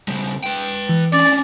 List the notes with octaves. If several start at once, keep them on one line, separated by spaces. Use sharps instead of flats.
C#3 G3
B4 G5
E3
C#4 D4 D5